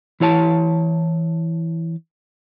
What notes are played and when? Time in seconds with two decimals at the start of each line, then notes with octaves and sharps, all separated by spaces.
0.20 E3 E4 C#5 A5